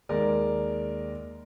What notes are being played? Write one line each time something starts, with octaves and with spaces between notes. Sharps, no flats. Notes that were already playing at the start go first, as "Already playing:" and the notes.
D#2 G#3 A#4 D5